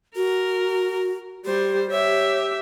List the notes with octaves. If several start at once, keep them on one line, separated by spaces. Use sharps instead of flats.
F#4 A#4
G3 G4 C5
G4 C#5 E5